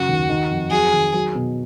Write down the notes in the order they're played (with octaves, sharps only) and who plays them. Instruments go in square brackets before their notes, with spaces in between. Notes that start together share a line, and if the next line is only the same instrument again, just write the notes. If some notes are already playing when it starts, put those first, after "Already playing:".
Already playing: [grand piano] F#2 C#3 [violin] F#4
[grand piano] D#2
D#3
F2
[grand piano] F#3 [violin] G#4
[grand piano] D#3
F#3
B2